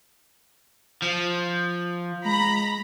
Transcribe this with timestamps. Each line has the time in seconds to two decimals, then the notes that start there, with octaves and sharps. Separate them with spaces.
1.02 F3
2.25 G#3 A#5 B5